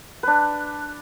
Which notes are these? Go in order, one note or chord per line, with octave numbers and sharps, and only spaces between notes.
D4 B4